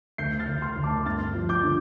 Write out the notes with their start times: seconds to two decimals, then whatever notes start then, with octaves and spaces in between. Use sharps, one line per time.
0.18 D2 G6 C7
0.40 F6 A6
0.48 D2
0.62 C6 F6
0.76 D2
0.83 A5 D6
1.05 G2 F6 A6
1.35 F3
1.49 D6 G6
1.64 D3